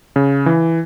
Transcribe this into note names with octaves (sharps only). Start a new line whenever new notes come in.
C#3
E3